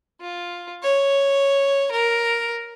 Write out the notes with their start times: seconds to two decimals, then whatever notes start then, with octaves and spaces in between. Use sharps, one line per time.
0.21 F4
0.83 C#5
1.91 A#4